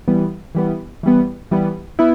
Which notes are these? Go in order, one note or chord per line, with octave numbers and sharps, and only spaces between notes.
E3 G3 B3
E3 G3 B3
E3 G3 B3
E3 G3 B3
B3 E4